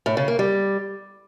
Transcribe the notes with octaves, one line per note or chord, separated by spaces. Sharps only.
A2
C#3
A#3
G3